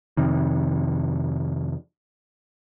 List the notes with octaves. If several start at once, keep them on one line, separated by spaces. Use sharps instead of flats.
F2 C3 D#3